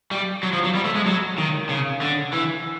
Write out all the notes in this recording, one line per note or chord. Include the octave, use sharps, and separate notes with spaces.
G3
F#3
F3
F#3
G3
A3
G#3
F#3
D#3
C#3
D3
E3